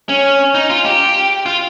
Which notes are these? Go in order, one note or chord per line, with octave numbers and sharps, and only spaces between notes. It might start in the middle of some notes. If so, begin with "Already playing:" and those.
C#4
D#4
F4
G4
F4